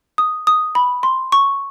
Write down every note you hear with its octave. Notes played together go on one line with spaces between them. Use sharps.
D#6
D#6
B5
C6
C#6